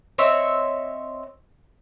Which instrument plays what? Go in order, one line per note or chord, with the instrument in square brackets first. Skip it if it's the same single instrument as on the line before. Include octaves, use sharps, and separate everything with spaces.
[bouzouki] C4 C#5 D#5 E5